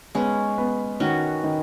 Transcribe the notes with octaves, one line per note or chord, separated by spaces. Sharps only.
G#3 B3 C#4
B3
D#3 C#4 F#4
D#3